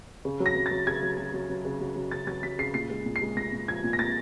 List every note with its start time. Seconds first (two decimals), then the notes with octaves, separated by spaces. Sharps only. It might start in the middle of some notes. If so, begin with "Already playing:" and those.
0.25 C#3
0.40 F#3
0.46 A#6
0.56 F#3
0.66 A6
0.71 F#3
0.87 C#3 G#6
1.02 F#3
1.18 F#3
1.34 F#3
1.50 F#3
1.65 C#3
1.81 F#3
1.96 F#3
2.11 C#3 A6
2.27 F#3 A6
2.43 F#3 B6
2.59 C#3 C7
2.74 A#2 C7
2.90 G#3
3.06 A#2
3.16 C7
3.21 G#3
3.37 A#2 A#6
3.53 A#2
3.68 F3 G#6
3.84 A#2
3.93 A#6
3.99 A#2 A6